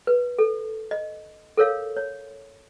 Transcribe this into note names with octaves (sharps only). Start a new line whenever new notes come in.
B4
A4
D#5
A4 A#4 C#5 F5
C#5